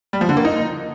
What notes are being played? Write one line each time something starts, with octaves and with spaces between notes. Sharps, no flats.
G3
F3
D3
A#3
D#4